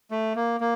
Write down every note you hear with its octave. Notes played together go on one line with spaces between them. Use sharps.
A3
A#3
A#3